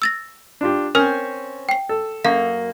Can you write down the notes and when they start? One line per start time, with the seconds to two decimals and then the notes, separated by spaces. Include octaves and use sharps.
0.02 E6 A6 A#6
0.61 D4 F4 G4
0.95 C4 C#4 A#4 G#5 F6
1.69 G5 C7
1.89 A4
2.25 F#2 A#3 F5